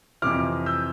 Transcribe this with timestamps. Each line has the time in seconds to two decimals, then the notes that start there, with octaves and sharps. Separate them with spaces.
0.22 F2 C3 E3 D6 F6
0.66 E6 G6